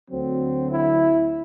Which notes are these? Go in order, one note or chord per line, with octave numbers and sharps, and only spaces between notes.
D2 D3 F#3 C4
E4